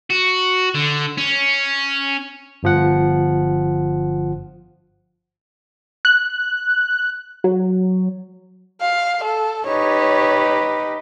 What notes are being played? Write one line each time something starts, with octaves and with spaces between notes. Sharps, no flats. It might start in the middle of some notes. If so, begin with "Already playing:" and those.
F#4
D3
C#4
G1 F3 F#5
F#6
F#3
F5
A4
D#4 G4 B4 C#5